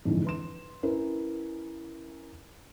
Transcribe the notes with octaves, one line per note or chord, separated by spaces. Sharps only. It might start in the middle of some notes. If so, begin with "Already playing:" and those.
F2 G#2 D3 E3
B4 C6 E7
C#4 E4 A#4 B4